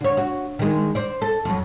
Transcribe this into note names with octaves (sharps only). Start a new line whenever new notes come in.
D3 C#5
F#4
D#3 G#3
C5 D5
A4
F2 F#3